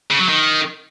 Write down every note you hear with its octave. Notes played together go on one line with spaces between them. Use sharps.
C#3
F#3
D#3